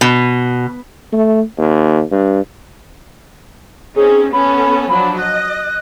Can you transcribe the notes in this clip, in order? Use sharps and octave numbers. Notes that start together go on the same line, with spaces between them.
B2
A3
D#2
G2
C4 C#4 D#4 G#4
B3 C#4 A4 B5
F3 F#3 D4 B5
D#5 F#6